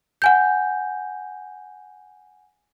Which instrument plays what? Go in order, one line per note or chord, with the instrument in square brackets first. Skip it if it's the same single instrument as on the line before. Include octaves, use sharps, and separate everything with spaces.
[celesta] F#5 G#5 G6